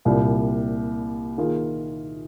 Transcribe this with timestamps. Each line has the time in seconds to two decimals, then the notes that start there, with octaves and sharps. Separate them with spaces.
0.05 C2 A#2 G3
1.38 D#3 A#3 F4 G#4